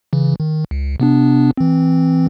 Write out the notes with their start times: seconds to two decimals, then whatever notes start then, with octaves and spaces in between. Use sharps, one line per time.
0.13 C#3 E3
0.40 D#3
0.71 C#2
1.00 C3 B3 D4
1.57 E3 C4